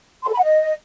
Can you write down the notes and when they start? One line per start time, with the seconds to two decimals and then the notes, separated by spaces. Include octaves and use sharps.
0.23 C6
0.28 A4
0.33 B5
0.38 F#5
0.43 D#5